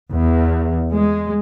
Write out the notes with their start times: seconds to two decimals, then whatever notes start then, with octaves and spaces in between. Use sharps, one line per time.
0.13 E2
0.91 G#3